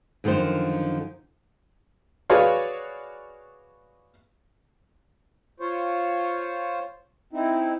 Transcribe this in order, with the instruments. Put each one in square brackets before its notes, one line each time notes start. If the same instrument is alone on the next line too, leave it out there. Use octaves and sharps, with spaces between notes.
[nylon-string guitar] F#2 D3 D#3 F3 C5
[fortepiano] F#4 G#4 B4 C#5 D5 F5
[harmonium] F4 C5 C#5
C4 D#4 E4